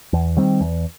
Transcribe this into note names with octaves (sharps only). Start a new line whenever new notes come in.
E2
D#3 G3 C4
E2